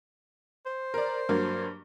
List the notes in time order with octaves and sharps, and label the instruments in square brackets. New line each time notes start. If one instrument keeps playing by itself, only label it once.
[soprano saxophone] C5
[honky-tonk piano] A#4 D5
G2 F#3 A#3